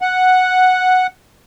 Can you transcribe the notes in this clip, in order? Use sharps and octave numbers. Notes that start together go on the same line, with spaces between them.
F#5